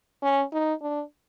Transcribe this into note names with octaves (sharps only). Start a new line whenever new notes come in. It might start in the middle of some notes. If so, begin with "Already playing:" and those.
C#4
D#4
D4